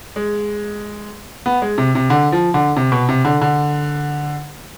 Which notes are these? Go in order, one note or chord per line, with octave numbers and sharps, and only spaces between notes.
G#3
B3
G#3
C3
C3
D3
F3
D3
C3
B2
C3
D3
D3